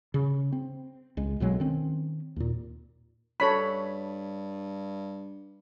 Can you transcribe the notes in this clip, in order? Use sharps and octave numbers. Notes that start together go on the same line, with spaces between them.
C#3
C4
C#2 G#3
B1 B2 F#3 G#3
D#3 C4 C#4
D#2 A#2
G2 A4 C#5 B5